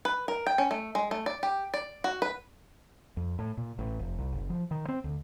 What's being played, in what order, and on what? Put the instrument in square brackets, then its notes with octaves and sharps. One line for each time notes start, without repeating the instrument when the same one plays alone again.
[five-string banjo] B4
A#4
G5
C#4
A3
G#3
A3
D5
G4
D5
F#4
B4
[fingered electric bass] F2
A2
A#2
A1
F1
C2
F#1
F3
D#3
C4
D2